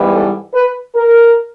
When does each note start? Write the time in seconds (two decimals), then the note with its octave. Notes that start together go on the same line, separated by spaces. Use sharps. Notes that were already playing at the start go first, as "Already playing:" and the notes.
Already playing: G#2 E3 G3 B3
0.12 A4
0.53 B4
0.95 A#4